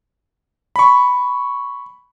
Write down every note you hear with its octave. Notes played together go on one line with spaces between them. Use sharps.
B5 C#6